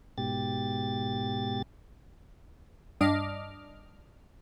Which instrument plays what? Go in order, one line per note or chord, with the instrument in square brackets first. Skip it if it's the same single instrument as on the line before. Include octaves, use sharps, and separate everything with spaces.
[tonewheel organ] G#2 B2 G4 A6
[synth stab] G2 D4 D#5 D6 F6